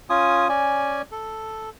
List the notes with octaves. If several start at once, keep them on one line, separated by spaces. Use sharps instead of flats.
C#4 F4 G#5 D#6
C#4 D5 G#5
A4